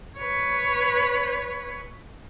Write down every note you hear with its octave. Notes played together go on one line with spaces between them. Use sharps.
B4 C#5